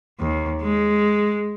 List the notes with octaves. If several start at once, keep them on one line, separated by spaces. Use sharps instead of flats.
D#2
G#3